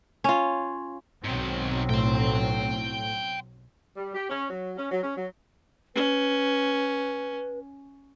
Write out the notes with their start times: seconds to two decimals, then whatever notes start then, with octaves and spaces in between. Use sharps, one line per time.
0.24 C#4 F4
1.25 B1 G#2 D#3 F#3 C4
1.90 A2 G5 C6
3.97 G3
4.14 G4
4.30 C#4
4.50 F#3
4.78 C#4
4.91 F#3
5.03 C#4
5.17 F#3
5.95 C#4 B4